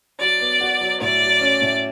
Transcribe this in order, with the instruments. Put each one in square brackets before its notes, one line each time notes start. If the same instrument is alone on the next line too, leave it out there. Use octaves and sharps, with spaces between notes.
[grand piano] F#3 [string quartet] D5
[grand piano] B3
F#4
F#3
[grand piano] A2 [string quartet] D5
[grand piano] F#3
C#4
A2